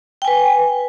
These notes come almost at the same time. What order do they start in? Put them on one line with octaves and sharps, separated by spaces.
G5 G#5 B4